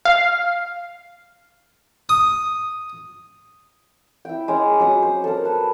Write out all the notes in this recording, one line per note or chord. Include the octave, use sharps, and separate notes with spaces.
F5
D#6
E4 G5
G#3 C#4 D6 D#6
F#3 C#6 D#6
C5
A4 A#4
B4 A5